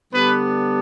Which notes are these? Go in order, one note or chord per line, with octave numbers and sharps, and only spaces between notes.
D3 G3 B3 D4 B4